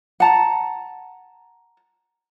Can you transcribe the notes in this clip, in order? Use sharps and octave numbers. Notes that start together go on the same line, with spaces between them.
F#5 A5 A#5